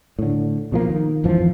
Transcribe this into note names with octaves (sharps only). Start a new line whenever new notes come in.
A2 D3
B2 F3 A#3
D#3
G#1 F2 E3 F3